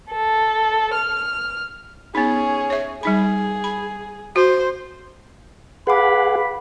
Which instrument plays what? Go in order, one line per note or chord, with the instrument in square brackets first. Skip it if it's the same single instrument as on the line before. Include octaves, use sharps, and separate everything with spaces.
[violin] A4
F6
[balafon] B3 D#4 [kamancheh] C#4 G#4
[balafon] C#5 E5
[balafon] G3 D#4 B5 [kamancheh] G#4
[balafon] B5
[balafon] F#4 [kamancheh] C5
[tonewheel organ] G#4 F#5 [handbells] B4 F5 D6 [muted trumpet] B5